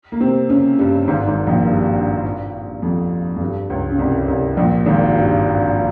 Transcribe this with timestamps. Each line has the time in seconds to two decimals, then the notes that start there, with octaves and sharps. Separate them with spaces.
0.12 A#3
0.21 C3 C4
0.49 C#3 C#4
0.79 G2 G3
1.08 G#1 G#2
1.27 G#1 G#2
1.47 A#1 A#2
1.65 G2
2.82 F2
3.36 F2
3.41 G2
3.69 C#2 C#3
3.90 C#3
3.98 C2 C3
4.28 C2 C3
4.57 A#1 A#2
4.86 G#1 G#2
5.16 G2